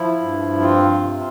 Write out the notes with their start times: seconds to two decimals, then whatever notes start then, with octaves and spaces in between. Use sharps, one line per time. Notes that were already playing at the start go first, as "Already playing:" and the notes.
Already playing: F3 E4
0.20 G2
0.60 C4 F4
1.01 C3